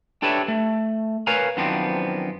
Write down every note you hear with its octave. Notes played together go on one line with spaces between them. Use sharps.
D4 G4 A4 B4 C#5 E5
A3
A#4 B4 C#5 F5 G#5 A#5
F#2 D#3 F3 B3 C4 D4